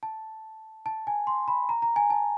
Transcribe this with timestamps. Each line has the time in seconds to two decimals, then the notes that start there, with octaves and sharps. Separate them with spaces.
0.03 A5
0.86 A5
1.07 G#5
1.27 C6
1.48 B5
1.69 A#5
1.82 A#5
1.96 G#5
2.10 A5